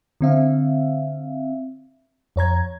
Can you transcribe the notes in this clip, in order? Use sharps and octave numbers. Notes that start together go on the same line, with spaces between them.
D3 C4 E5 F5
F2 C#5 A#5 G#6